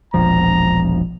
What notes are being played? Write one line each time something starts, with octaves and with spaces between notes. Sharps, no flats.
E1 A#1 F3 A#5